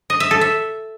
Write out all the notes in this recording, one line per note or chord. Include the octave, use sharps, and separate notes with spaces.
D#5
E5
A4
E5